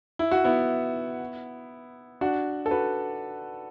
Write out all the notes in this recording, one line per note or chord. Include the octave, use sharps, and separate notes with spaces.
E4
F#4
B3 E4
D4 F#4
A4
F#4 B4